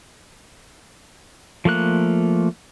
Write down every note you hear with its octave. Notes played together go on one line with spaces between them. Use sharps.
F3 A3 A#3 F#6